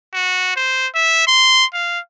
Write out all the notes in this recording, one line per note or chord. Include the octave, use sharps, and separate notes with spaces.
F#4
C5
E5
C6
F5